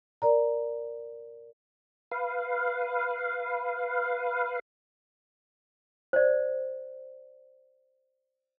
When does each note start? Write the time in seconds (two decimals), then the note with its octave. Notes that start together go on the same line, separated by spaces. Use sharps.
0.22 A#4 D5 A#5
2.11 B4 F5
6.13 C5 D5